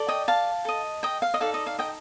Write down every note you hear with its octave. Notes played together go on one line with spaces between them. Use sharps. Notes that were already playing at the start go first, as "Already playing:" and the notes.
Already playing: A4 D5
D#5 G5
F5 A5
A4 D#5
D#5 G5
F5
D#5
D#4 A4 D5 F5
D#5
F5
D#5 G5